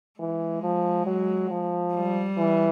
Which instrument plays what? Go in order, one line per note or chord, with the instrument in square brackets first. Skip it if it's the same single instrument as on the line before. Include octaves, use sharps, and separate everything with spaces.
[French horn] E3 [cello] G#3
[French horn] F3
F#3
F3
[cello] G3
[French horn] E3